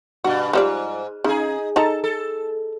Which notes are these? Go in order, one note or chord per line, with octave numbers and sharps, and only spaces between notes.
G2 B2 F#4
G#2 F3 G3 D5
C#3 D#4 G#4
D#4 A4 A5 A#5
A4